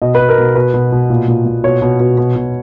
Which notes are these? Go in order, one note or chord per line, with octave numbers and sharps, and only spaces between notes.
B2 D#5
B4
B2
A#4
B2
B2 B4
B2
B2
A#2
A#2
A#2
B2 C#5
B2
B2
B2
B2